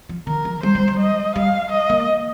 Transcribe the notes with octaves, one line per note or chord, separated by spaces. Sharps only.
F3
D#3 A#4
F3
G3 C5
G3
G3
D#5
G3 F5
D#5
A#3